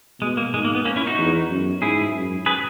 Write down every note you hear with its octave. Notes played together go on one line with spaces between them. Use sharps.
B2 G#3
A#3
G#2 G#3
A#3
B3
A#3 C#4
C#4 E4
D#4 F#4
E2
F#2
G#2 E4 G#4
F#2
G#4 B4